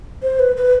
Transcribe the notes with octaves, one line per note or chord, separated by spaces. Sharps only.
C5
B4
B4